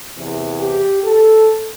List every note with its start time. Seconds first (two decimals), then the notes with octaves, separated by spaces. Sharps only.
0.16 E2 C3 E3
0.60 G4
1.04 A4